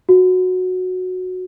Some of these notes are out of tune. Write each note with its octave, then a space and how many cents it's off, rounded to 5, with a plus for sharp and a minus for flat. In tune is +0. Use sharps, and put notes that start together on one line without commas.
F#4 -10